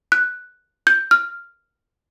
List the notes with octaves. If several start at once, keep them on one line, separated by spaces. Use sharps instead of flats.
F#6
G6
F6